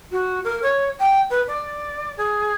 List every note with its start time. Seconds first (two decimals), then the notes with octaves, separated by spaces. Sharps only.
0.11 F#4
0.44 A#4
0.62 C#5
0.99 G5
1.30 B4
1.47 D5
2.17 G#4